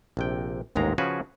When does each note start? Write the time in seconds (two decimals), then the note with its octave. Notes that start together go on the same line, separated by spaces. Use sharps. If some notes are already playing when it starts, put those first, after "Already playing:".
0.17 A#1 C3 G5
0.76 A1 D#2 G#2 G#3 A#5
0.98 C#3 F3 C#4 F#4 G#4 B4